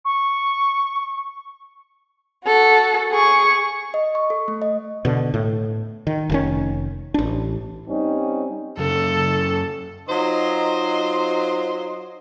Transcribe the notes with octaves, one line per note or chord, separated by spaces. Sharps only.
C#6
F#4 A4
G#4 C#6
D#5
C#6
A4
A3
D#5
B2 D3
A2
D#3
F1 D#3 C#4
A1 D4
G3 C4 C#4 D#4
F#2 C#3 A4
F#3 D#4 F4 C5 D#5 C6